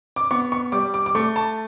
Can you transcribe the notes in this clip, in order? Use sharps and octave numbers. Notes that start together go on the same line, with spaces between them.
D6
B3 C#6
C#6
G3 D6
D6
D6
A3 C#6
A5